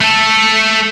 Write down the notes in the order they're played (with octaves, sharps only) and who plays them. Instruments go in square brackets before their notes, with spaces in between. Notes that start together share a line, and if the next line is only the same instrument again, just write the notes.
[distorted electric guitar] A3 A4